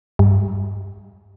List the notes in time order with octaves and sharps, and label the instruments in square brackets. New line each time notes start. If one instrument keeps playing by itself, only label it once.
[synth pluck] G2